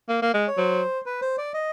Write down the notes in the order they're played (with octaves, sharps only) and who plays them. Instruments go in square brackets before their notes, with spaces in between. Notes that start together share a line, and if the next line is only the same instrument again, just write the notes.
[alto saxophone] A#3
A#3
G#3
[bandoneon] C#5
[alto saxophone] F#3 [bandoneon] C5
[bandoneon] B4
C5
D5
D#5